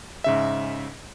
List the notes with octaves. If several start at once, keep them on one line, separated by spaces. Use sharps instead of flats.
G#2 C#3 E5